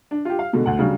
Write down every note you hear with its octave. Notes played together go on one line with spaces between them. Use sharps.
D4
F4 G4
F5
B2 D3 G#3
D2 F#5
C#3 F#3 G3 D4